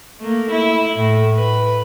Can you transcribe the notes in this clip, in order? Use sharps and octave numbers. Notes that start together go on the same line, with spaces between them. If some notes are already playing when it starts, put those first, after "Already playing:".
A3 A#3
E4
A2
B4